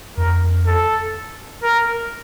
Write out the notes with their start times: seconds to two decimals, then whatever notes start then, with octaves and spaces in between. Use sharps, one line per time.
0.17 F2 A#4
0.66 A4
1.63 A#4